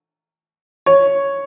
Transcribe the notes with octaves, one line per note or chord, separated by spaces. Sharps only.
C#5